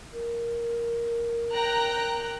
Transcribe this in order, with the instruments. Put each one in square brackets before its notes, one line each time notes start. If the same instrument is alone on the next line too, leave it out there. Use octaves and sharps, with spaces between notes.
[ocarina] A#4
[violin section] G5 A#5 F#6